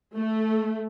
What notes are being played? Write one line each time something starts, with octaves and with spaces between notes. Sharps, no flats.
A3